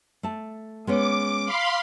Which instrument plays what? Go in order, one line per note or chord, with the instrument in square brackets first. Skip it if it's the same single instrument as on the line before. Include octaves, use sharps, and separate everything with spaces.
[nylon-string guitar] A3 A5
[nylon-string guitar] G#3 B3 C#4 [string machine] D6
[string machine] F5 B5 C6